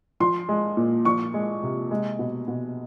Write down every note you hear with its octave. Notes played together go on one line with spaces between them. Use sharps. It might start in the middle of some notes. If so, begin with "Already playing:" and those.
F3 C6
G#3
A#2
F3 C#6
G#3
C3
G#3
B2
B2